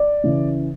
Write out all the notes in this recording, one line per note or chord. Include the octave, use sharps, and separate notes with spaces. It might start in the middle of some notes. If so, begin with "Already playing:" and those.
Already playing: D5
C#3 E3